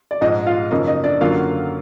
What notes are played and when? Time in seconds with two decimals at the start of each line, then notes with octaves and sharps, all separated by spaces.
0.11 D5
0.21 A#1 G#2 F3 G#3 D#4 D#5
0.46 F4 F5
0.71 F#1 F#2 F3 A#3 D#4 D#5
0.87 D#4 D#5
1.04 D4 D5
1.21 F#2 D3 F#3 A#3 F4 F5